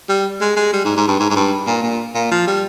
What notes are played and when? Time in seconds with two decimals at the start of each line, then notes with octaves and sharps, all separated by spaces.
0.09 G3
0.41 G#3
0.56 G#3
0.73 G3
0.84 G#2
0.97 G#2
1.08 G2
1.20 G#2
1.30 G#2
1.36 G2
1.67 A#2
1.83 A#2
2.15 A#2
2.31 F3
2.47 G3